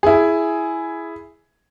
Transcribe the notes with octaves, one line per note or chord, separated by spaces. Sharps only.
E4 G#4